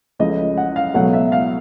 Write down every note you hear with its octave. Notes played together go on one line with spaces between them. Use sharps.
C#2 C#3 F3 A3 D#5
F#5
F5
C#2 B2 F#3 A3 F#5
E5
F5